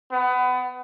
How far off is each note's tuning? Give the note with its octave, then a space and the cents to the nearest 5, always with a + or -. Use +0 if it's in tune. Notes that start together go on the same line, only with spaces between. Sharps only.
B3 +25